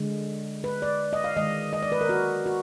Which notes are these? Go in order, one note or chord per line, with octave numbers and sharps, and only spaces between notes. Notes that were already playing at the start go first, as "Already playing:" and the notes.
Already playing: D3 G#3
B4
D5
D#5
F5
D#3 G#3 D#5
D#5
D5
B4
A#4
F#4
F#4